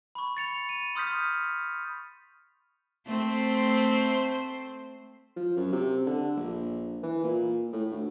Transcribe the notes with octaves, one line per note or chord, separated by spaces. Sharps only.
B5 C#6
A6 C#7 F7
D#7
C6 D#6 F6 G6 B6
A3 C4 C5
F3
F#2
C3
D3
A#1
E3
A#2
A2
D2